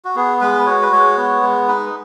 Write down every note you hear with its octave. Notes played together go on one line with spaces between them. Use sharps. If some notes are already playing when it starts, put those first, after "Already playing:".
F#4
B3 G#4
G#3 B4
F#4 C#5
B4
G#3 C#5
B3
G#3
D#4 B4